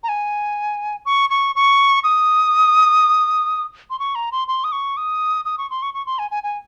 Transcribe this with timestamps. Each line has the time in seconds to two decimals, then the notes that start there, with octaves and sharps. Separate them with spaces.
0.03 A#5
0.09 G#5
1.06 C#6
1.30 C#6
1.56 C#6
2.04 D#6
3.90 C6
4.00 C#6
4.15 A#5
4.32 C6
4.48 C6
4.64 D#6
4.72 C#6
4.97 D#6
5.45 D#6
5.58 C#6
5.70 C6
5.82 C#6
5.94 C#6
6.06 C6
6.19 G#5
6.31 G#5
6.43 G#5